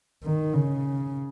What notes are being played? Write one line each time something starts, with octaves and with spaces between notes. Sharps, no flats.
D#3
C#3